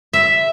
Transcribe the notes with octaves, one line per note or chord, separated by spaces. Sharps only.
E5